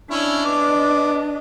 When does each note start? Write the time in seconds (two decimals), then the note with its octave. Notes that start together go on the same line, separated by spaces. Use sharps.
0.11 C#4 D4 E4 D#5
0.45 B3 D6